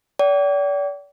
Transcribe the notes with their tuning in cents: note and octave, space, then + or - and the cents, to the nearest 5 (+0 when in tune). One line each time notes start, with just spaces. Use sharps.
D5 -40 G5 -40